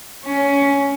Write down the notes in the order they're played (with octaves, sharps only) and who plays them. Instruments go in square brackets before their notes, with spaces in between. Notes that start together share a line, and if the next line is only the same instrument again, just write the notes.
[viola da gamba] C#4